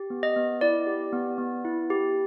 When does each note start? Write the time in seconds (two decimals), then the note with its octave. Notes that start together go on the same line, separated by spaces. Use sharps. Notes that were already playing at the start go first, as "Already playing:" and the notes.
Already playing: G4
0.10 B3
0.23 D#5
0.36 B3
0.61 E4 D5
0.87 G4
1.13 B3
1.38 B3
1.65 E4
1.90 G4